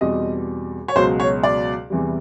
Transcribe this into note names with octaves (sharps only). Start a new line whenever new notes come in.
E2 B2 G3 C4 D#5
C#5
C#2 B2 F#3 C5
C#5
D5
E2 C3 E3 G3